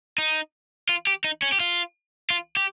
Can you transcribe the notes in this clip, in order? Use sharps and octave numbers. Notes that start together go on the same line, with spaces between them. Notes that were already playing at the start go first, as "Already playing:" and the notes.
D#4
F4
G4
D#4
C#4
G4
F4
F4
G4